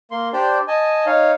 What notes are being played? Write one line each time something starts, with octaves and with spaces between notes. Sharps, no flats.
A#3 C6
D4 G4 C5 D5
D#5 G#5 A5
D#4 C#5 F5